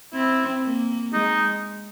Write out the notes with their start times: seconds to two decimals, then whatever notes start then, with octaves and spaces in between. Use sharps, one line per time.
0.14 C4 E4
0.63 A#3
1.13 G#3 D#4